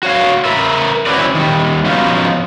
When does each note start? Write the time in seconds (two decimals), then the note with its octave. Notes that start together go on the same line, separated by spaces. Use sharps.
0.03 F#4 C#5 F5
0.45 A#4 B4 E5
1.06 C4 C#4 E4 F#4 B4 D5
1.35 D#3 G3
1.86 F3 B3 C#4 D#4 F4 F#4